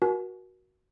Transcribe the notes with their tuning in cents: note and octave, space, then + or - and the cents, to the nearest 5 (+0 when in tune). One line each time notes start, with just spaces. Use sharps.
F#4 +0 A#4 +35 G#5 +45